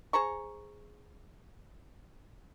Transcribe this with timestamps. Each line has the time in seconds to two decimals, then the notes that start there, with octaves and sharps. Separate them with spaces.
0.13 G#4 C5 A#5 C#6